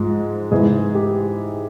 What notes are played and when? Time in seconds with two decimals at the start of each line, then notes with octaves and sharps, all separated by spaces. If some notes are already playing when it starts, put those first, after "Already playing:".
Already playing: G#2 F3 G#3
0.51 G#2 E3 G#3 G#4
0.95 G4